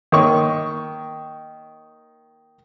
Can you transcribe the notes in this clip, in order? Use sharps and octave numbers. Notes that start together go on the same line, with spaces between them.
D#3 A#3 C#5 C#6